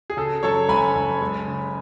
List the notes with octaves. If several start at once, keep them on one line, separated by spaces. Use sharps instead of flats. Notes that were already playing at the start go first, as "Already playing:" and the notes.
G#4
C#3 A4
F#2 A4 C#5
F#1 G#5 B5
F#1
G#3
C#3